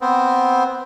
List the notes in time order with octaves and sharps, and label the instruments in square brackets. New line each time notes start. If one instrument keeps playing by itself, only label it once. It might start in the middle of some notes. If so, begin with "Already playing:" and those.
[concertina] B3 C4